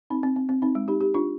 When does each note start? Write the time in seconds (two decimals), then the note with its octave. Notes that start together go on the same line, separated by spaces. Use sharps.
0.10 C4 D#4
0.23 C4
0.36 C4
0.49 C4
0.62 C4 D#4
0.75 G#3
0.88 D#4 G4
1.01 D#4 G4
1.14 D4 F4